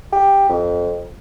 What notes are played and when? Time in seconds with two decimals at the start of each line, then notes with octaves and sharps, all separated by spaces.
0.12 G4
0.49 F2